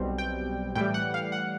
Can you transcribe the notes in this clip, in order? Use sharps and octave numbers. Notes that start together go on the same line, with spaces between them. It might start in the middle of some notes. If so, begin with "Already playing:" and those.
Already playing: B1 B2 G3 C4
G5
A2 E3 G3 G5
F#5
F5
F#5